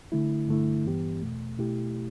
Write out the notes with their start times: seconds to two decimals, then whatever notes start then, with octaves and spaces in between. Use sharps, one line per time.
0.12 D3 A3 E4
0.47 G2 D3 A3 E4
0.85 G2 E3 B3 G4
1.21 E2 B2 A3
1.58 B2 A3 E4 G4